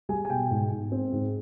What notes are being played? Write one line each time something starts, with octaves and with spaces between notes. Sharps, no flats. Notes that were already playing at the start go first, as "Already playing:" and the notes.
G3 G#4 G#5
G#5
B2 G5
G#2
G#2
C4
G#2